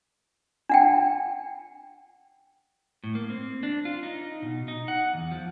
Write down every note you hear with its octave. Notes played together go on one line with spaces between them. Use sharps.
D4 F#5 G5
A2
A#3
C4
D4
F4
D#4
B2
D#4
F#5
E2
F3